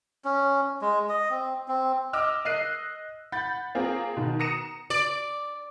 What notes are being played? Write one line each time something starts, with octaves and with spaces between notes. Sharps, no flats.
C#4
G#3
D#5
C4
C4
D#5 D6 E6 F6
D#5 F#6 C7 D#7
F#5 B5 G6 A6
A#3 C4 F4 G#4 A#4
B2 D#3
A#5 D#6 A#6 C#7 D#7 E7
D5